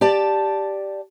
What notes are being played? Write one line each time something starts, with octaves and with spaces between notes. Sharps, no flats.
G4 D5 A5